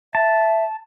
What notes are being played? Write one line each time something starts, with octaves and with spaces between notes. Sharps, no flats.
E5 A5